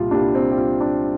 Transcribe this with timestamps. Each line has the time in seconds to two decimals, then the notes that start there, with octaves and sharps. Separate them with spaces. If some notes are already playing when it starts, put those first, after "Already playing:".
Already playing: C2 A#2 G3 A#3 F4
0.11 C2 A#2 G3 A#3 D4
0.35 C4
0.51 G4
0.58 F4
0.81 D4